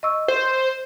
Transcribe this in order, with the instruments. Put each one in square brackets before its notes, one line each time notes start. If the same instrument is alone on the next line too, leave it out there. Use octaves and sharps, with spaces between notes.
[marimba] D#5 C#6 E6
[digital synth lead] C5